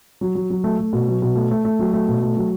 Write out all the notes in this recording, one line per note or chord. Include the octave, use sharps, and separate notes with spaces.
F#3
F#3
F#3
A3
A3
B2
F#3
B2
A3
A3
A3
F#3
A3
B2
A3
F#3